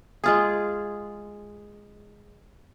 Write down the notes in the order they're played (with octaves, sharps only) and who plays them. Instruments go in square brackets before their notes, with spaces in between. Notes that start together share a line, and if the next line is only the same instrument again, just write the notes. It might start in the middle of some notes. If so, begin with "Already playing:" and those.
[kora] G#3 F4 G#4